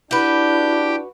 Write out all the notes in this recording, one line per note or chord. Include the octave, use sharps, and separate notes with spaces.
D4 E4 F#4 G4 B4 G5